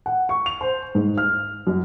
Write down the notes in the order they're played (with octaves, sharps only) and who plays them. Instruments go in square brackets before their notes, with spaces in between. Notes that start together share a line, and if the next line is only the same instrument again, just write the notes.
[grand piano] F#5
C#6
F7
C5
G#2
F6
F#2